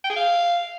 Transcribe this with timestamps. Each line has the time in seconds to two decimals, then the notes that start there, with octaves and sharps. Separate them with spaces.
0.04 G5
0.10 G#4
0.16 F5